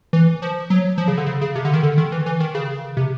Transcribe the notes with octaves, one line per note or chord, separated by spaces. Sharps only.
E3
F3
F#3
F3
C#3
D3
C#3
C#3
C3
D3
D#3
D3
D#3
E3
E3
D#3
C#3
C3